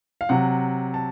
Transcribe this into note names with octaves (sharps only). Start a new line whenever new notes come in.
F5
C3 F#3 F#5
A5